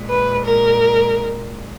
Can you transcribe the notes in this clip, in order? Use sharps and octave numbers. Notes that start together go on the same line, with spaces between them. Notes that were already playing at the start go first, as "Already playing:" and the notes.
Already playing: A#2 G#3
B4
A#4